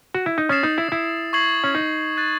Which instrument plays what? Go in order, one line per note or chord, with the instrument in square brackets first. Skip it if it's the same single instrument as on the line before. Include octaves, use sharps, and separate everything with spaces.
[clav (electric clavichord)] F#4
E4
D#4
[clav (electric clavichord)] C#4 [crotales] D#6 A6 C7 E7
[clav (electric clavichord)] D#4
E4
E4
[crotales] C#6 G#6 C7 F#7
[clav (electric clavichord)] C#4
D#4
[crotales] F#6 A6 C7 D#7